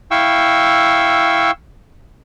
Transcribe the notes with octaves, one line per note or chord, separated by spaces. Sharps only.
E4 F5 G5 C#6 E6